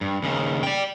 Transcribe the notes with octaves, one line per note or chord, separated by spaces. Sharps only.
G2
D#2 C#3
D5 G5